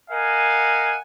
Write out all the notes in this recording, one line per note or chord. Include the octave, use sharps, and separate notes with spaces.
A#4 D#5 F5 F#5 G#5